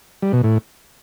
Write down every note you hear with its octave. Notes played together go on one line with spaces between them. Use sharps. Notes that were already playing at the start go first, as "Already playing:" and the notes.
G3
B2
A2